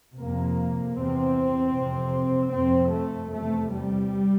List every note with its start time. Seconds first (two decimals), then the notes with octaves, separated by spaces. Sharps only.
0.14 F2 C3 A#3
0.94 E2 C3 C4
1.73 F2 C3
2.51 F2 C3 C4
2.91 A3
3.30 E2 C3 A3
3.70 G3